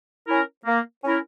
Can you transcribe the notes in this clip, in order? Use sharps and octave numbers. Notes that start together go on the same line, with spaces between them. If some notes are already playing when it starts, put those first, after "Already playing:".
C#4 E4 A#4
A#3
C#4 E4 A#4